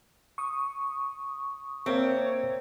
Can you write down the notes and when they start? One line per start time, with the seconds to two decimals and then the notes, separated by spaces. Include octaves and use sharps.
0.38 C#6 D#6
1.86 A#3 C4 A#4 C#5 E5